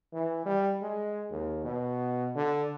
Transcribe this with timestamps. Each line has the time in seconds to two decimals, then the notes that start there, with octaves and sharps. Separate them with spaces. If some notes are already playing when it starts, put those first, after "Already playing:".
0.13 E3
0.46 G3
0.82 G#3
1.31 D#2
1.65 B2
2.35 D3